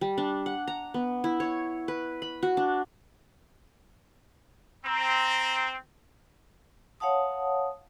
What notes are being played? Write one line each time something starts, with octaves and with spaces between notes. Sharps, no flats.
G3
D4
F#5
A#5
B3
E4
C#5
B4
B5
F#4
D4
C4 A#5
C#5 F5 F#5 A5 D#6